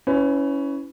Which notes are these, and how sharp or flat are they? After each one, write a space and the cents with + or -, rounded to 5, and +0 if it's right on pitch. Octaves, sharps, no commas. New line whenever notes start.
C#4 +10 E4 -15 B4 +35